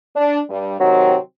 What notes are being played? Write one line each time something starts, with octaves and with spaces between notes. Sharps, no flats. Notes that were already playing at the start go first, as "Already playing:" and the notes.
D4
G2 G3
C3 D#3 F#3 C4